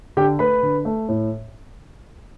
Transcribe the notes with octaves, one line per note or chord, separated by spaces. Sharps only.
D3 G4 G5
A3 B4 B5
D3
A3
A2